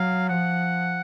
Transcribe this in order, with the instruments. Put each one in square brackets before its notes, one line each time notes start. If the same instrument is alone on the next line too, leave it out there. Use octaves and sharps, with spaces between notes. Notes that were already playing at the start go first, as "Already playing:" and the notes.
Already playing: [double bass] F#3 [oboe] F5
[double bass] F3 [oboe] F#5